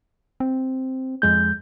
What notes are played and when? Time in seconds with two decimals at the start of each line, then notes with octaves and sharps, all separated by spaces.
0.40 C4
1.22 F2 G#3 G6